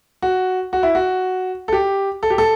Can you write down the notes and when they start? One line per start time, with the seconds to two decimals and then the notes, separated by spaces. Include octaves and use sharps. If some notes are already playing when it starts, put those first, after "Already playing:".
0.22 F#4
0.73 F#4
0.83 E4
0.95 F#4
1.68 A4
1.73 G4
2.23 A4
2.30 G4
2.38 A4